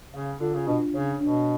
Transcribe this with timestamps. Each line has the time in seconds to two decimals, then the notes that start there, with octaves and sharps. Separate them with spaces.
0.14 C#3 F5
0.40 D3 F4
0.54 C#3
0.67 B2 D4
0.94 C#3 C#5
1.21 B2 D4